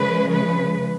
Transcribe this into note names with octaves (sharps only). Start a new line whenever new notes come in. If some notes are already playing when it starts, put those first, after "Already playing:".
Already playing: C#3 F3 G#3 B4
B4